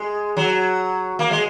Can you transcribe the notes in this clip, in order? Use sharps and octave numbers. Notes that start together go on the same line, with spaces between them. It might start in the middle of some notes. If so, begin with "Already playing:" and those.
Already playing: G#3
F#3
A#3
G#3